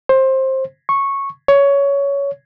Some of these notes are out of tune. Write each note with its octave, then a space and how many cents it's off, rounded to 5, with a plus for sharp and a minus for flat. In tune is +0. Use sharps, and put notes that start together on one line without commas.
C5 +20
C#6 -10
C#5 +15